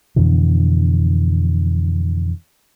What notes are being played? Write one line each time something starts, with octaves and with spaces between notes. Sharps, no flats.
F2 B2 D3 E3